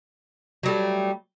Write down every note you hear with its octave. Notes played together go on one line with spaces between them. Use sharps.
F#3 G3 A3